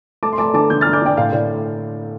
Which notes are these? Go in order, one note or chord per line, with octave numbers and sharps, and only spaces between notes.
A3 A5 D6
C6
A3 A5 D6
D3 A5 D6
D3 D6 G6
F6 A6
D3
D6 G6
D3 D5 G5
A2 F5
A2 D5